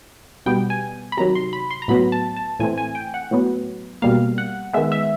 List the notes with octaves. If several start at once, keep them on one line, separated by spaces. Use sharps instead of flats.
B2 G3 B3 G5
G#5
B5
C3 D#3 F#3 A#5
C6
B5
C6
A#5
A2 F#3 B3 B5
A5
A5
A2 E3 A3 C4 G#5
G#5
G5
F#5
A2 F#3 B3
B2 G3 A#3 F5
F#5
D#3 G#3 B3 E5
E5